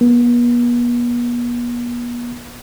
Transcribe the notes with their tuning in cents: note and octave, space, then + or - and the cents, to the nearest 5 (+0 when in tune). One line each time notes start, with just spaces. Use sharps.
B3 -40